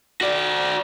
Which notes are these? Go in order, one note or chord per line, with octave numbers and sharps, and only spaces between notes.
F#4 D5